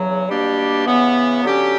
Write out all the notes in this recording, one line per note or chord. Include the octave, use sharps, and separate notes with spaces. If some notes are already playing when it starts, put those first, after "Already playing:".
Already playing: E2 C#3 F#3
B2 G3 A#3 D4 G4
C#3 E3 B3
D3 F#3 C#4 G4